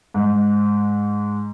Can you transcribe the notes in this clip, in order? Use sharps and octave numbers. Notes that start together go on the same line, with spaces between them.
G#2